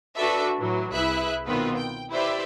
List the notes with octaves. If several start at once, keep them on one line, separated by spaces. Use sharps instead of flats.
D4 F#4 A4 B4 D5 E5
A2 E3 F#3
C2 E4 G#4 B4 E5 F#6
B2 D#3 B3 C4 F4 B4
G5
E4 G4 B4 C5 D5 E5